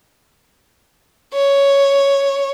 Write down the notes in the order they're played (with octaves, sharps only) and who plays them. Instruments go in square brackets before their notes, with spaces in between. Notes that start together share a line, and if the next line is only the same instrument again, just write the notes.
[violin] C#5